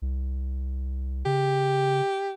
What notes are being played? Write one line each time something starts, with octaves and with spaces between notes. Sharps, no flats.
C2
C#3 G4